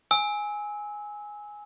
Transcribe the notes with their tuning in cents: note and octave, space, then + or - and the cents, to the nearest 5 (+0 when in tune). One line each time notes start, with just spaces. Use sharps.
G#5 +0 E6 -25